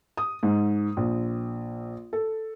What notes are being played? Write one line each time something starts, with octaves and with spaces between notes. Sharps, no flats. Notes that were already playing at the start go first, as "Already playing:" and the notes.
D#6
G#2
A#1
A4